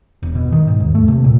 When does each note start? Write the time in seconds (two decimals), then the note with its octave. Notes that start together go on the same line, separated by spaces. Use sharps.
0.23 E1
0.35 B2
0.52 D#3
0.68 G#2
0.80 D#2
0.95 A3
1.08 C3
1.24 A#2